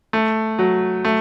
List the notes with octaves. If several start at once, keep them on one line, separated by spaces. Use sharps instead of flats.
A3
F#3
A3